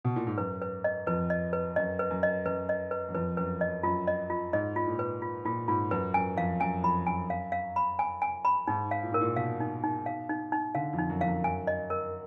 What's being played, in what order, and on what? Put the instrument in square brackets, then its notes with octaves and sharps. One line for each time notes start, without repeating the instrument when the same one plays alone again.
[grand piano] B2
A#2
G#2
[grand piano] F#2 [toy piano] B4
[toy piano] B4
D#5
[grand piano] F2 [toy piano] B4
[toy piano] D#5
B4
[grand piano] F#2 [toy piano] D#5
[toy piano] B4
[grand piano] F#2
[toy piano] D#5
[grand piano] F#2 [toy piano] B4
[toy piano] D#5
B4
[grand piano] F#2
[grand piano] F2 [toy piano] B4
[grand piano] F#2 [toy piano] B4
[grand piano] F#2 [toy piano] D#5
[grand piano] F#2 [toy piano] F4
[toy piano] D#5
F4
[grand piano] G#2 [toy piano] D#5
[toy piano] F4
[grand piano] A#2
[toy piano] B4
F4
[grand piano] A#2 [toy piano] F4
[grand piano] G#2 [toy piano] F4
[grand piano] F#2 [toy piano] B4
[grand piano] F#2 [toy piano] G#5
[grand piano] F2 [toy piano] F5
[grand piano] F#2 [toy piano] G#5
[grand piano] F2 [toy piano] B5
[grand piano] F#2 [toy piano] G#5
[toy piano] F5
F5
B5
G#5
G#5
B5
[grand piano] G#2 [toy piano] D#4
[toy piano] F5
[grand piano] A#2
[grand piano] G#2 [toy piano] A#4
[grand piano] A#2
[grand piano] B2 [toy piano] F5
[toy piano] D#4
D#4
F5
D#4
D#4
[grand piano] D3 [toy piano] F5
[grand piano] F2
[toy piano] D#4
[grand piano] F#2
[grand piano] F2 [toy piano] F5
[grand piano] F#2
[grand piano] F#2 [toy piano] G#5
[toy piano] D#5
A#4